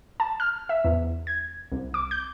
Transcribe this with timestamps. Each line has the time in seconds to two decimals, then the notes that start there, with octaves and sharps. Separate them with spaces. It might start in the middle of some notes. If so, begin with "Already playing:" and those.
0.20 A5
0.40 F6
0.69 E5
0.85 E2
1.27 G#6
1.72 C2
1.94 D6
2.11 G6